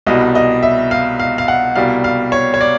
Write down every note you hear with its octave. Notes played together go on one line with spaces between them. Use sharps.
C2 B2 G3 D#5
D#5
E5
F5
F5
F5
F#5
C2 B2 G3 F5
F5
C#5
C#5
D5